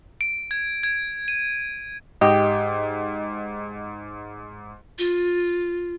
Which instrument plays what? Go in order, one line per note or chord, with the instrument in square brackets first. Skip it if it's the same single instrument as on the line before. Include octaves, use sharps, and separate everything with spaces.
[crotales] D7
G#6
G#6
D#7
[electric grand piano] G#2 [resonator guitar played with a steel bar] G4 [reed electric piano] D#5
[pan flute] F4